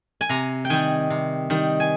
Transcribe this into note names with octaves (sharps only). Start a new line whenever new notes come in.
G#5
C3 A#5
G5
D#3 G3 G#5
C3
D#3 G3
G#5